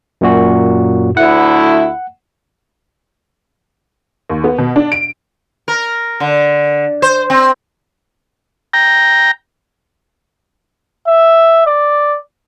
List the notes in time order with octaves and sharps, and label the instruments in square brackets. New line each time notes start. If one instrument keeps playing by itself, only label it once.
[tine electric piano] F#2 A#2 F#4
[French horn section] D2 E4 [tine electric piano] F#5
[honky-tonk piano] D#2
B3
B2
D4
D7
[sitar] A#4
D3
C5
C4
[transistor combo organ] G5 A#5
[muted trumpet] E5
D5